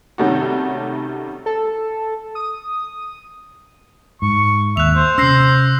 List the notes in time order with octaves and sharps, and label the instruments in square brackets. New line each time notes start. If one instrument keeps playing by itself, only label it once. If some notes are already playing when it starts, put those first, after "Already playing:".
[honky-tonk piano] C3 D#3 G3 A3 C#4 F#4
[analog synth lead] A4
D#6
[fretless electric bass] G#2 [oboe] C#6
[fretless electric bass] D#2 [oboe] E5 [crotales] F#6 F7
[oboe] C5
[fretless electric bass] C3 C#4 [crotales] E6 A#6 C7